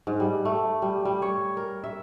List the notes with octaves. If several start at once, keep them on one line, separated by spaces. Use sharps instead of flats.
G#2
G3
A3
G3
G3
C#5
A#4
E5